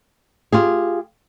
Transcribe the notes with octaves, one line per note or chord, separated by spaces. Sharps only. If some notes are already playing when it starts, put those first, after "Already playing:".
F4 G4 G#4